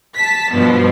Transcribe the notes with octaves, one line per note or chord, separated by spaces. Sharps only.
A5 B6
G2 B2 F3